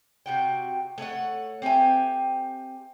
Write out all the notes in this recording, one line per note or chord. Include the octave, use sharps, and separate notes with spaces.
C3 F#4 G5
A3 C#5 D5 F#5
C4 G4 E5 G#5